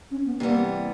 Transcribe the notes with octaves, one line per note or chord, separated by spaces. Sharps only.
C#4
B3
C3 E3 G3 A#3 B3